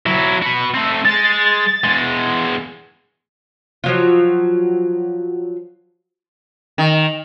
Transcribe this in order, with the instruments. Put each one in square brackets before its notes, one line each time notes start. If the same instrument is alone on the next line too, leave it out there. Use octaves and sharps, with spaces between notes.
[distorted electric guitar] F#3 E4
F#4 B4
A3 C4
[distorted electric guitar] G#3 [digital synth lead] A6
[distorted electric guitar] E2 G#3
[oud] F3 F#3 F4
[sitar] D#3